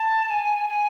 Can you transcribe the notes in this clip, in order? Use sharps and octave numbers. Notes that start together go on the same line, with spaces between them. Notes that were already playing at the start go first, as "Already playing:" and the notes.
Already playing: A5
G#5
G#5